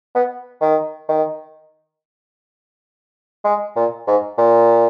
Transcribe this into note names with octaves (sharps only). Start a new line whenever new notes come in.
B3
D#3
D#3
G#3
A#2
G#2
A#2